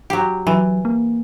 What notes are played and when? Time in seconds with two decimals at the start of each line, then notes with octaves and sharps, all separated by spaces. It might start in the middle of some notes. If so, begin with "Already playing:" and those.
0.10 F#3 G4
0.47 E3 F#3
0.85 A#3